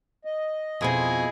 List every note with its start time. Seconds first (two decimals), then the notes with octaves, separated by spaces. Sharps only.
0.25 D#5
0.81 F2 B2 C4 E4 F4 G#4